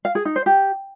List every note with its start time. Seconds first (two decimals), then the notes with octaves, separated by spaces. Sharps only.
0.05 F5
0.15 G#4
0.25 D#4
0.36 C5
0.46 G4